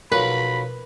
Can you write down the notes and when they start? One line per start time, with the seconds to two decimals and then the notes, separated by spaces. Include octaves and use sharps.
0.12 B1 F3 F#3 A#4 B4 B5